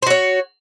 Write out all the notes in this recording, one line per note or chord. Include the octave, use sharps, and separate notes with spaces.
F#4 C5 C#5